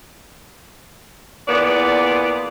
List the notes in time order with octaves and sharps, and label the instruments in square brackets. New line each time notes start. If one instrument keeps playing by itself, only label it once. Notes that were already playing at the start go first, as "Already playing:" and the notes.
[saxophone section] E2 A#2 B3 D5